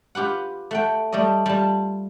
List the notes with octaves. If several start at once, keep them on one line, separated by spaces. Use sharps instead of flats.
F4 G4 B4 F#5
A3 F#5 G5
G3 A3 D5 D#5
G3 F4 A5